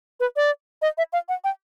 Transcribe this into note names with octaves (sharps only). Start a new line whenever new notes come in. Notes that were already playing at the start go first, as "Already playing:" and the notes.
B4
D5
D#5
E5
F5
F#5
G5